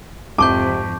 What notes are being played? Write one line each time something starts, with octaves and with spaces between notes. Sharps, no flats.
F2 G#2 C3 A5 C#6 D6 G6